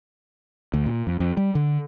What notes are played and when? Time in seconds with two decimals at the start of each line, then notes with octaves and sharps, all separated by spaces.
0.74 D2
0.86 A#2
1.07 F2
1.20 F2
1.37 G3
1.55 D3